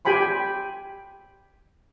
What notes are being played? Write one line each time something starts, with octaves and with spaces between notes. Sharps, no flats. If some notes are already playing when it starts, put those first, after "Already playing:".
G4 G5 G#5 B5 C6